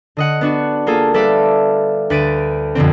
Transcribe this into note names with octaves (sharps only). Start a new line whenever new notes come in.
D3 D#5 F#5
B3 D4 F#4
A#3 F4 G#4 A4
G3 A4 B4 D5 E5 F5
D2 B4 A6 D7 D#7
F2 B2 D3 C4